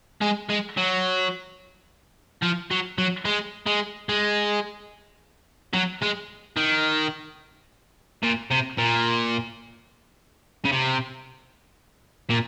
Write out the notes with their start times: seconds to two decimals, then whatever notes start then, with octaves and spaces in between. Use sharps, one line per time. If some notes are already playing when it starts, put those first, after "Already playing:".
0.21 G#3
0.49 G#3
0.77 F#3
2.42 F3
2.71 F#3
2.98 F#3
3.25 G#3
3.66 G#3
4.09 G#3
5.74 F#3
6.02 G#3
6.57 D#3
8.23 A#2
8.51 C3
8.79 A#2
10.65 C#3
10.72 C3
12.30 A#2